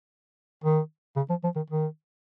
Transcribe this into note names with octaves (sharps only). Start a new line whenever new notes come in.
D#3
C#3
F3
F3
D#3
D#3